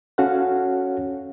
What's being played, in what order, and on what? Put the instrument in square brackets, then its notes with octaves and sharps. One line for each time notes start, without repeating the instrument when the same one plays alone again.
[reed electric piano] C#4 F#4 A4 C#5 F5 F#5